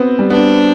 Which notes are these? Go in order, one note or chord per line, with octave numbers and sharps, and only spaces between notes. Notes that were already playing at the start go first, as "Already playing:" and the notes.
Already playing: B3 C4
G3
B3 D4